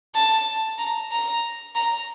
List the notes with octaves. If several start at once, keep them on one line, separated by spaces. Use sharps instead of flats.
A5
A#5
A#5
A#5